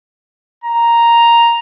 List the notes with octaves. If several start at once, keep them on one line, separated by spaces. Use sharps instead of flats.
A#5